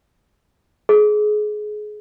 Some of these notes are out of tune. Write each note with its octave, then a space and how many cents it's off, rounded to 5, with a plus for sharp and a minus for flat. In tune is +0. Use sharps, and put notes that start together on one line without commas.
G#4 +25